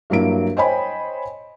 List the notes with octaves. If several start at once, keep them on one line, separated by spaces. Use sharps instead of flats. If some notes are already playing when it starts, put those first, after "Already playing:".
G2 F#3 A#3 E4 D7
C5 C#5 D#5 G5 G#5 B5